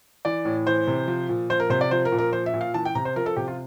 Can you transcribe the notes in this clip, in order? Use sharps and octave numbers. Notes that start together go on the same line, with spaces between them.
E3 D5
A2
E3 C5
C3
F3
A#2
F3 C5
A#4
C3 C5
D5
F3 C5
A#4
A#2
A#4
F3 C5
E5
A#2
F5
E3 A5
G5
C3 A#5
C5
F3 A#4
A4
C3 G4
F4